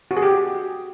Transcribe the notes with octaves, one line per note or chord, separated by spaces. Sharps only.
F#4
G#4
G4